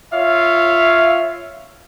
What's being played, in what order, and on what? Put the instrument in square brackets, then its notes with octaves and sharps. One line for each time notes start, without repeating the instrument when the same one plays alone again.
[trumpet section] F4 C#5 F5 [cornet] E5